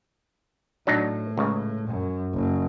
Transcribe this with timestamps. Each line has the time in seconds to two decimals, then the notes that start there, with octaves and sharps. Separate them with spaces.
0.87 A2 F#3 D4 D#4
1.37 C#2 C#3
1.89 F#2
2.33 F#1